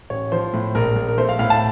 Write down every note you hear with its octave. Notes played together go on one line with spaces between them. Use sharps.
A1 C#5
F3 C5
A2
A#1 A#4
A#1
A#4
A3 C5
F5
A2 F5
A5